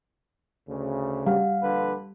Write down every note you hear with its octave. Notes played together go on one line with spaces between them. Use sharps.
D2 C#3
G3 F5 F#5 F6
A#1 D3 B4